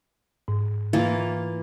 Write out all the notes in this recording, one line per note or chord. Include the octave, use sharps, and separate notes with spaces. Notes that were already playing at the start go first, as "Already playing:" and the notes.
G#2
E3 A#3 F4